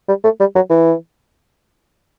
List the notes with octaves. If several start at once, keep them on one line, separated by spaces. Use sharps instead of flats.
G3
A3
G3
F#3
E3